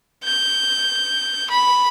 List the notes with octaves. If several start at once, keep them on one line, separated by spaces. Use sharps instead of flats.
G6
B5